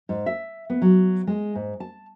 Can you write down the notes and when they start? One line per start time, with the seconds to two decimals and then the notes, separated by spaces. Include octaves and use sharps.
0.09 G#2
0.26 E5
0.70 B3
0.82 F#3
1.27 G#3
1.55 G#2
1.80 A5